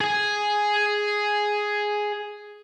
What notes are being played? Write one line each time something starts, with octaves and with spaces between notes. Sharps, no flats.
G#4 G#5